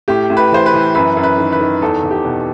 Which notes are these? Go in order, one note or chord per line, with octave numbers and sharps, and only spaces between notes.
A2 G4
A2
B4
E3 C5
B4
E3
F#2 B4
F#2
B4
D#3
B4
D#3
E2 A4
E2
G4
B2